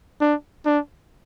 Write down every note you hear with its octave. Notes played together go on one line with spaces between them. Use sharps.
D4
D4